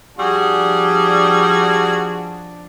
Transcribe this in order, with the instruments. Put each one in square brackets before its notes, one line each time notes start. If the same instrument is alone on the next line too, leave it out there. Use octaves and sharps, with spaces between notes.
[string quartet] F3 D4 [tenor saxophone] G3 [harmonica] F#4 G#4